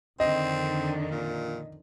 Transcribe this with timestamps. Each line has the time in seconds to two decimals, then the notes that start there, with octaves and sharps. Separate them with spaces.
0.20 F2 D3 D#3 C4 D#5
1.11 A#2